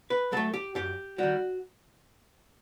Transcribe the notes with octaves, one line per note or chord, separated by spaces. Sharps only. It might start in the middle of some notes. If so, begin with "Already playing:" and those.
B4
F#3 A3 A4
G4
F#2 G4
D#3 G3 F#4